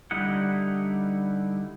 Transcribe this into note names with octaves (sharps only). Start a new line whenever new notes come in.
D3 G3 D#4 E4 F#5